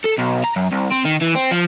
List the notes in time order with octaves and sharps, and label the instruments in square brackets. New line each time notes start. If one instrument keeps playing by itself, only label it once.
[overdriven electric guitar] A4
B1
A#5
F#2
C2
C4
D#3
E3
C4
F3